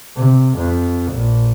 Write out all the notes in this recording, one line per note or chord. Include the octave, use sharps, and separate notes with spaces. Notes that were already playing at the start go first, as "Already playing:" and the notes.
C3
F2
A#1